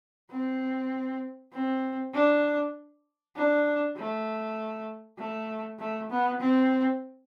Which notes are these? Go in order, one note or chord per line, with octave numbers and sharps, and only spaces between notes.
C4
C4
D4
D4
A3
A3
A3
B3
C4